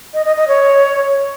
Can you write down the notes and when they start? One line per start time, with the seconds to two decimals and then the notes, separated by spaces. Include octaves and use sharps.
0.14 D#5
0.25 D#5
0.37 D#5
0.48 C#5